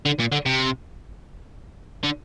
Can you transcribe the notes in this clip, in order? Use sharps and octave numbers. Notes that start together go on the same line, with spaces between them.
D3
A#2
D3
C3
D3